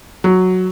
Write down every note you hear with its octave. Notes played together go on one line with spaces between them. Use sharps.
F#3